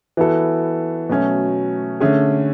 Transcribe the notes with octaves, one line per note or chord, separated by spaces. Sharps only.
E3 B3 F#4 A4
B2 F#3 A3 C#4
D3 A3 C#4 G#4